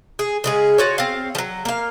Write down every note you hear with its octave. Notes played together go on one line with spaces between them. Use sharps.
G#4
C#3 G#3 G#4
F4 F#4 C#5
C4 F5
F3 F#3
A#3 F5